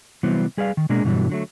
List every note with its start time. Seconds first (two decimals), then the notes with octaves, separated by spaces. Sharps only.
0.23 C3 E3 F#3 G3 B3 C4
0.57 G3 G#4 B4 D5 F5
0.77 D#3
0.89 B2 G#3 A#3 D4 G#4 A#5
1.04 G2 B2 D3 E3 F#3 G3
1.29 D3 F#3 A3